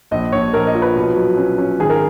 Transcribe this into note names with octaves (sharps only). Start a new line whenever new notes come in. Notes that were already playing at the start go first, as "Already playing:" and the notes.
A#1 D#5
A#1 C#5
A#1 A#4
D#5
F3
B4
B2
F#3
C#4
C#4
G#1 G#4
A#4